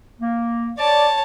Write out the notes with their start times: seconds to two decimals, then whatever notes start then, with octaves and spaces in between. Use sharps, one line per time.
0.21 A#3
0.78 C#5 D5 A5